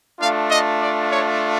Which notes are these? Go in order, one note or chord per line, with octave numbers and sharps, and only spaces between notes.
A3 D4 F4 F5
D#5
D5
C#5